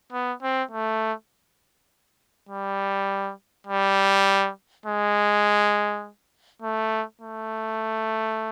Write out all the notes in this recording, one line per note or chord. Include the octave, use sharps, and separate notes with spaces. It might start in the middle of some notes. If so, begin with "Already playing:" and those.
B3
C4
A3
G3
G3
G#3
A3
A3